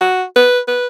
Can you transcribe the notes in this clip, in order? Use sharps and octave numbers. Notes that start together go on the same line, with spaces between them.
F#4
B4
B4